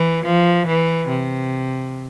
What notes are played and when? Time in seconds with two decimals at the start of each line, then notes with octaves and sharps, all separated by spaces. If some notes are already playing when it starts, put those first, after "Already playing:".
Already playing: E3
0.25 F3
0.67 E3
1.08 C3